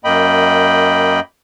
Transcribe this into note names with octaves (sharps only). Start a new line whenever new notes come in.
F#2 A#3 D#5 G5 B5